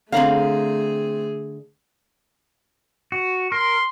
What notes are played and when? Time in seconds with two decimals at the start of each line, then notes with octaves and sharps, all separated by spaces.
0.12 D3 A3 C4 G#4 F5 A#5 B5
3.12 F#4
3.52 A#4 C6